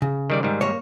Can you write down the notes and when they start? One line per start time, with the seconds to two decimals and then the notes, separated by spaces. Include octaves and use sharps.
0.02 C#3
0.30 D#3 G3 D5
0.43 G#2 D#3 G3
0.61 A#3 C#5